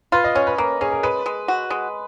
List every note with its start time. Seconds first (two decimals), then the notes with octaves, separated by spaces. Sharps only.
0.12 F4 B4
0.24 D#5
0.35 C#4 C#5
0.47 B4
0.58 A#3 B4
0.81 C#4 G#4
0.92 A#4
1.03 G#3 B4
1.26 G#3
1.48 F#4
1.71 G#3